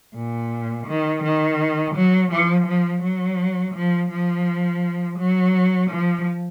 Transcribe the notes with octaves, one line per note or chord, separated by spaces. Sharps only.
A#2
D#3
D#3
F#3
F3
F3
F#3
F3
F3
F#3
F3